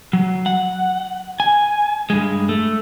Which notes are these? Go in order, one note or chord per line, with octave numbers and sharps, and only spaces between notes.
F#3
F#5
G#5
G2 G#3
A3